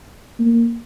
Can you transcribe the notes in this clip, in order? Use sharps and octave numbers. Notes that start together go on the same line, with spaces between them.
A#3